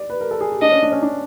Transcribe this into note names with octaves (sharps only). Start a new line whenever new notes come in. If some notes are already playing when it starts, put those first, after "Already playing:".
Already playing: D5
B4
A#4
A4
G#4
G4
D4 D#5
C#4
D4
C#4
D4